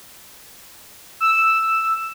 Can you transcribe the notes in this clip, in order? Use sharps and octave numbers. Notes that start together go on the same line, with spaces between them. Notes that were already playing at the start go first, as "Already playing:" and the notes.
E6